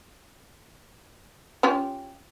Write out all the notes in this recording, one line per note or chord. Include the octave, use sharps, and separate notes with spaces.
C#4 F4 G4